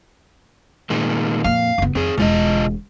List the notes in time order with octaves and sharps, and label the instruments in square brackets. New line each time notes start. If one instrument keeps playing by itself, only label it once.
[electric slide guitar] A#2 D#3 G#3
[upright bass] F2 A#2 [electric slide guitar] F5
[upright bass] F#1 B3
[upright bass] F2 [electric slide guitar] C4 G#4
[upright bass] E1 G#3 [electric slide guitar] B2 F4 D#5